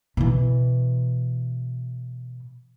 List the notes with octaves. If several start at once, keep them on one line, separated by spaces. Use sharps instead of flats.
B2 E3